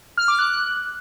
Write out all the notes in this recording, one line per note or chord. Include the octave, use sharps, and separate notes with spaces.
F6
D6
F#6